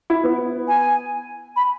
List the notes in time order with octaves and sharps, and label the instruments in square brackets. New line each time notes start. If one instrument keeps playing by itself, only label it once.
[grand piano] E4
B3
[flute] G#5
B5